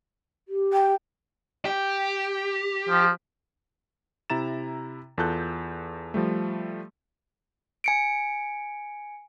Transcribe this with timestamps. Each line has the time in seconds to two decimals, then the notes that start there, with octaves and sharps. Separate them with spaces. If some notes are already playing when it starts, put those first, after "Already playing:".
0.48 G4
0.73 G5
1.65 G4
2.89 F3
4.30 C3 E4 A#5 A6 E7
5.18 E2 F4 A4 A5 F#6 G6
6.14 F3 G3 A3
7.84 G#5 C#7 D7